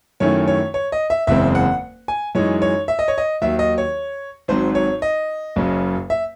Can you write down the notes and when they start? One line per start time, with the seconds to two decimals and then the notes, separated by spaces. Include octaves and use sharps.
0.20 F#2 D#3 A3 C#4 E4 C#5
0.48 C#5
0.74 C#5
0.92 D#5
1.10 E5
1.27 F#1 E2 C#3 G#3 C4 E5
1.55 F#5
2.08 G#5
2.35 F#2 E3 G#3 D#4 C#5
2.62 C#5
2.88 E5
2.99 D#5
3.08 C#5
3.18 D#5
3.42 D#2 D#3 F#3 E5
3.59 D#5
3.78 C#5
4.48 G#1 G#2 F#3 C4 C5
4.75 C#5
5.02 D#5
5.56 F#1 F#2 C#3 F#3 C#4
6.10 E5